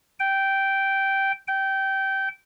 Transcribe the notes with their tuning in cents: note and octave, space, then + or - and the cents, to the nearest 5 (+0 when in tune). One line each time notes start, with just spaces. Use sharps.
G5 -10
G5 -20